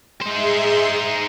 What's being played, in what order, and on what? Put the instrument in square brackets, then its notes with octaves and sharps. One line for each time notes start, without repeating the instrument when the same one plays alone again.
[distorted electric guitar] D#4 C5 [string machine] G#4 E5 C6